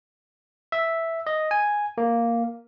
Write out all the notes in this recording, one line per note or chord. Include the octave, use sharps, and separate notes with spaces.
E5
D#5
G#5
A#3